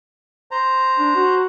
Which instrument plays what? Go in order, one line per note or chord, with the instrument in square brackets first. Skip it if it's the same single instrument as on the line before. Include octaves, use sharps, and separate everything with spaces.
[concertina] C5 A#5
[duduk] D4
F#4